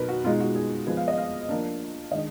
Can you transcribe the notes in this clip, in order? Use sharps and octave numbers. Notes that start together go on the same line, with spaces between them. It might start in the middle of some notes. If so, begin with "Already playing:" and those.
Already playing: B2 F#3 B3 D#4 A#4 B4
F#4
B2 G#3 D#4 F4
F#4
G#4
F3 G#3 B3 G#4
F5
D#5
F5
F3 A#3 D4
D#3 G#3 D4 D#5